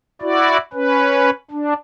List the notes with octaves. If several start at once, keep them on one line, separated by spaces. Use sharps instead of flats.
E4 F#4 D5
C#4 B4
D4